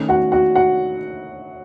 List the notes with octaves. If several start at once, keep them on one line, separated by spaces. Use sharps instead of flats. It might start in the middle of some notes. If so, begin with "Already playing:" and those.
Already playing: D#3 A3 C#4
F#4 F#5
F#4 F#5
F#4 F#5